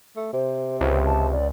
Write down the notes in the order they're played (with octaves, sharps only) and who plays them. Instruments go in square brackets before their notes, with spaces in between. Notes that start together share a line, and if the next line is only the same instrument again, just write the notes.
[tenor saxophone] A3
[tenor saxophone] C3 [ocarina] C5
[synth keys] C#2 [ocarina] C5
[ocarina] A5
D5